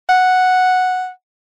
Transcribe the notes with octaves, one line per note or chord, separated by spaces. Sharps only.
F#5